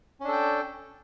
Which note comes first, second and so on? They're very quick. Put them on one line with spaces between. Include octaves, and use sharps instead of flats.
C#4 D4 A4 G5